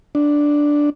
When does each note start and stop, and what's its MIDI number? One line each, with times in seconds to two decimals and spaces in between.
0.15 0.90 62